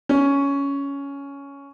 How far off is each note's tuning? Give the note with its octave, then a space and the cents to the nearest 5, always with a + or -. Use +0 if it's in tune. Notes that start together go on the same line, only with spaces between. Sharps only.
C#4 +10